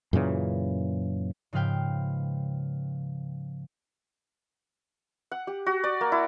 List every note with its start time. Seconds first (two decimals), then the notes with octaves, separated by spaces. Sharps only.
0.13 F#2 A#2 C#3 E3
1.53 G#2 C#3 F3 B4 F5 G5
5.32 F#5
5.47 G4
5.66 F#4
5.84 D5
6.01 A#3
6.12 E4